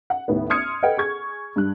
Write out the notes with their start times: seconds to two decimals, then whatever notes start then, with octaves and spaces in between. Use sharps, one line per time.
0.10 F#5
0.28 D#2 A2 B3
0.50 C6 D#6 F6 G#6 C#7
0.82 A4 B4 D#5 F#5 G5
0.97 G#4 C#6 G#6
1.56 G2 F#6